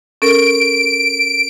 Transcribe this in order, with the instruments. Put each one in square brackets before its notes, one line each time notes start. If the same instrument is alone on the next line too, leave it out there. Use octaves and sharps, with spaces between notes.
[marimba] C#4 A4 A#4 [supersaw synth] D7